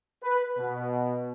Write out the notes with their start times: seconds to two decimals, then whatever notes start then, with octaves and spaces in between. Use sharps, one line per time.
0.23 B4
0.58 B2